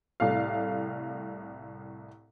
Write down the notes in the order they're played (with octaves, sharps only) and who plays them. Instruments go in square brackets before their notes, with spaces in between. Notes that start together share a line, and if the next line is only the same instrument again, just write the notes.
[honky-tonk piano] C2 A2 F5